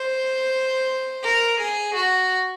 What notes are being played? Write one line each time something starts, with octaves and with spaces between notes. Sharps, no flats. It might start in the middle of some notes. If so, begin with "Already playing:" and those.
Already playing: C5
A#4
G#4
F#4